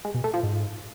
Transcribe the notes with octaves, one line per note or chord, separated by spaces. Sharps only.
G#3
B2
A3
F3
G#2